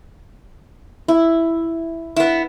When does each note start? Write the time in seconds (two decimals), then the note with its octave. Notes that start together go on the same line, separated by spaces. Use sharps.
1.08 E4
2.16 B3 E4